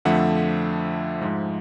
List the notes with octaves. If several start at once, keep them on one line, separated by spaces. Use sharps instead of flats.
F2 D3 F3 A3 E5 F#5
G#2 F3 G#3